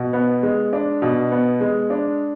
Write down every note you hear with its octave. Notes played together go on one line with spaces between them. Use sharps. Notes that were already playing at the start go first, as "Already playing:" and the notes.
Already playing: B2
B3
G#3
D4
B2
B3
G#3
D4